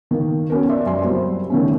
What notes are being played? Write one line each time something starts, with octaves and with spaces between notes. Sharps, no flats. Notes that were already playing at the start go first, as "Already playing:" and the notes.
D#3 A#3
B3 C#4 F#4 A#4
D5 E5 C6
F#2 G#5 C6
F#3 G3 C4
D#3 A3 C#4